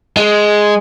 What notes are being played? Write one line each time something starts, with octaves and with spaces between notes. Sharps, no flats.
G#3